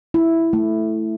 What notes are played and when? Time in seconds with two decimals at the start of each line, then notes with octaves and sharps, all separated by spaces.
0.14 E4
0.53 A3